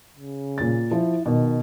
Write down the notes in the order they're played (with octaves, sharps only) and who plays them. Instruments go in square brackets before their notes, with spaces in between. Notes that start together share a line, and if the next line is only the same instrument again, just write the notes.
[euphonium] C#3
[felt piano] A#2 A6
[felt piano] F3 [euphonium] E4
[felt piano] B2 [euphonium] D#3